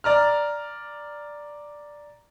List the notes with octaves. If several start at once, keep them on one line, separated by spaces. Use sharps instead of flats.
D5 A#5 F6